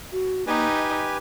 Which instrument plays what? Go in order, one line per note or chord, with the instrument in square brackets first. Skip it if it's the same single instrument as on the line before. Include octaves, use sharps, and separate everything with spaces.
[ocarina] F#4
[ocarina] A#3 [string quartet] D#4 [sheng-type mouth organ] G4 B4 G#5
[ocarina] D#5